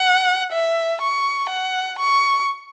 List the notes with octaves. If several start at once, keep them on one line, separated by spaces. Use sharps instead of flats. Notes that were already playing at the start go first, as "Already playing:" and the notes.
Already playing: F#5
E5
C#6
F#5
C#6